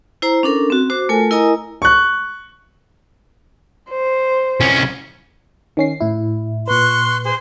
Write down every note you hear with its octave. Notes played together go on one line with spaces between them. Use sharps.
E4 C5 A#5
C#4 D4 A4 A#4
C4 F#4
F#4 C5 D6
A3 F4 A4 A#4 G#5
E4 A#4 D#5 G#5 A#5 D#6
C#6 F#6
C5
C2 C#4
D#3 C#4 C7
A2 E4
A#2 B4 C6 C#6 F#6
G#4 C5 C6